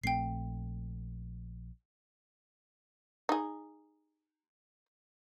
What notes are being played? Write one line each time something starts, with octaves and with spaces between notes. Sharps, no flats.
A#1 A3 C4 G5 C7
D#4 G#4